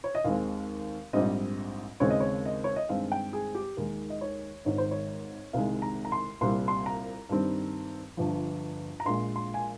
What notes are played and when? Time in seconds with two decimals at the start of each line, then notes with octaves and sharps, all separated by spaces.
0.04 C#5
0.15 D#5
0.24 D#2 D#3 G#3 C4 F5
1.13 A#1 G#2 G3 C4 D#5
2.00 D#2 C#3 G#3 C4 C#5
2.10 D#5
2.20 C#5
2.45 D#5
2.64 C#5
2.76 D#5
2.89 G2 D#3 G#3 C4 F5
3.12 G5
3.33 G#4
3.55 G4
3.77 D#2 D#3 G#3 A#4
4.10 D#5
4.21 C#5
4.65 G#1 G#2 D#3 C#5
4.78 C5
4.91 C#5
5.53 C2 C3 D#3 G#3 F5
5.82 A#5
6.05 A#5
6.12 C6
6.41 C2 A#2 G3 C4 C6
6.68 C6
6.86 A#5
7.29 G2 D#3 G3 C4
8.17 G1 G2 F3
9.00 A#5
9.06 A#1 A#2 G#3 C6
9.36 C6
9.54 G#5